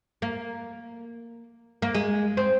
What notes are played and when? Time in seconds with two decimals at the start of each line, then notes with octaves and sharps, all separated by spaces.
0.22 A#3
1.82 A#3
1.95 G#3
2.37 C4